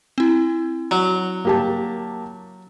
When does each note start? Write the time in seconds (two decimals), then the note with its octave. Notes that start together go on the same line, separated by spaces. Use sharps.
0.18 C4 E4
0.91 F#3
1.45 A#3 G4 A5